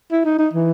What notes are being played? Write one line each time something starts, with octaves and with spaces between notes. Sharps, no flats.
E4
D#4
D#4
E3